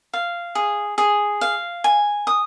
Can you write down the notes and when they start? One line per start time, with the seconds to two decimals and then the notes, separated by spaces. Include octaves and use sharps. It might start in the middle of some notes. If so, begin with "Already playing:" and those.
0.13 F5
0.55 G#4
0.98 G#4
1.41 F5
1.84 G#5
2.27 D#6